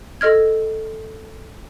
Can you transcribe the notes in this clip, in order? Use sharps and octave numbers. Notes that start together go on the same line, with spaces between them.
A4 D#5 F6 G#6